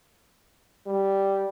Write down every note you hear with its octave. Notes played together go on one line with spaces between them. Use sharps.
G3